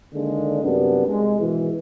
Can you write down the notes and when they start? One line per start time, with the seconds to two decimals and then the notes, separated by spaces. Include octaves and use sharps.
0.13 D3 D#3 G#3 A#3 D4
0.62 F#2 C3 G3 B3 D4
1.07 C2 G#3
1.39 G#2 B2 D#3 E3